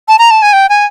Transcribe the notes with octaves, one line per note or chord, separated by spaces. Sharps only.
A5
A#5
A5
G#5
G5
G#5